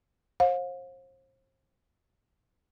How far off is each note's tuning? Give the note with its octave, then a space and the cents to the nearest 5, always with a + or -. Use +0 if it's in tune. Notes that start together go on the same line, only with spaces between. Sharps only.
C5 +35 F5 +35